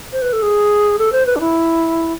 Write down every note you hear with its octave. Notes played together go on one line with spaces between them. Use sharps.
C5
B4
A4
G#4
A4
C5
B4
D4
E4